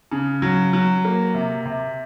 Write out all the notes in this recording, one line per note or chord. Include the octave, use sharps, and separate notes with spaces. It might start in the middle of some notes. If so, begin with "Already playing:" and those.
C#3
F#3
F#3
A#3
C3
C3